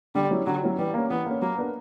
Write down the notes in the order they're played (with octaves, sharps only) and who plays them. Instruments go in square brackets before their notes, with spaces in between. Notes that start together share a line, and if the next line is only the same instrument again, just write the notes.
[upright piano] D3 [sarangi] G3
[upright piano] F#3 C#4 E4
[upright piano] D3 [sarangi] F#3
[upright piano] F#3 C#4 E4
[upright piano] E3 [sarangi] G3
[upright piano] A#3 C#4
[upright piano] E3 [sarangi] B3
[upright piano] A#3 C#4
[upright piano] F#3 [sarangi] A#3
[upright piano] B3 D4 A#4